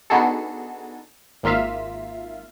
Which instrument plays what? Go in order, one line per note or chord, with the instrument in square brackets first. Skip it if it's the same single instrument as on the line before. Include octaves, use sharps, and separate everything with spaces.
[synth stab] B3 D4 D#4 F#4 G#4 A4
G#1 A#3 F4 E5 F5